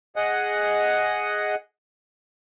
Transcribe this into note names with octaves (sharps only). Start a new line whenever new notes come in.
G#4 D#5 F#5